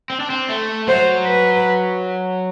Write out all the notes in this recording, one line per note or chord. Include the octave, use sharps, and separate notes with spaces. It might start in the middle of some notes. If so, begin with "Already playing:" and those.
C4
D4
C4
A3
F#3 C5
B4